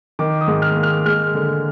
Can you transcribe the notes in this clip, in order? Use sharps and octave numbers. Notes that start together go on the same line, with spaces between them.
D#3 D6
D#6
G#2
F6
A#3
F6
G#3 F6
D3